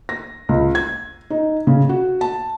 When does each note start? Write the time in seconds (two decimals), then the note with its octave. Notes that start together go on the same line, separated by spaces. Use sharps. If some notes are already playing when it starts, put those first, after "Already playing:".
0.09 A#6
0.49 C#2
0.75 G#6
1.30 D#4
1.67 C#3
1.89 F#4
2.21 A5